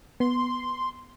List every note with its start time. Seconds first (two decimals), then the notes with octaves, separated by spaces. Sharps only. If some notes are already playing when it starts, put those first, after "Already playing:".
0.20 B3 C6